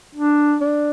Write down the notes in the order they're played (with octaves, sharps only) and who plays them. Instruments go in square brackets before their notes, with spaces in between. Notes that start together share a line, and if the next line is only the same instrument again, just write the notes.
[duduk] D4
[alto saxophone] D4